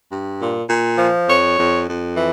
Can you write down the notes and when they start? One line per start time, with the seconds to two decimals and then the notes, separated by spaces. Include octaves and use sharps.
0.10 G2
0.40 A#2
0.68 A#2
0.98 F3
1.27 F2 C#5
1.57 F2
1.87 F2
2.16 E3